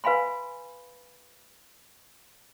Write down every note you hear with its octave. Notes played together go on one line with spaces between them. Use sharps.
B4 F5 G#5 B5 C6